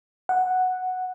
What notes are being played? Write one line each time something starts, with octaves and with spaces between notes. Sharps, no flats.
F#5